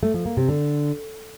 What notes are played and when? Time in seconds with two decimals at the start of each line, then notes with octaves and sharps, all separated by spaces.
0.03 A3
0.14 F3
0.26 A#3
0.37 C3
0.49 D3